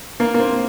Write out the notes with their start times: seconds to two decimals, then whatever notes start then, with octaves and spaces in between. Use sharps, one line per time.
0.20 A#3
0.34 A#3
0.40 C4